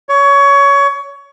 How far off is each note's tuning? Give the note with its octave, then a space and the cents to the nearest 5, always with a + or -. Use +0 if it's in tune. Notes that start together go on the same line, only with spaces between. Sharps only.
C#5 +20